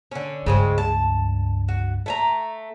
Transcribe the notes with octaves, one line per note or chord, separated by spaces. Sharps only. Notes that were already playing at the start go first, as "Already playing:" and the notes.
D3 C#4
C#2 G2 C#3 G#3 C4
A5
F#4
A3 G#5 A#5